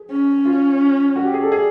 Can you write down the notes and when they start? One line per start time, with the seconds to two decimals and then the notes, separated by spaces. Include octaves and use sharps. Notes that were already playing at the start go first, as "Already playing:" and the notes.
Already playing: G#4
0.10 C#4
0.45 F4
1.16 F#4
1.25 G4
1.34 G#4
1.42 A4
1.52 G#4